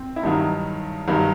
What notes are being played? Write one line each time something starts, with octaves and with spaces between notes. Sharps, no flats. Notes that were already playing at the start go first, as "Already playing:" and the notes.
Already playing: C4
E4
G2 D#3 F#3 D#4
G2 D#3 F#3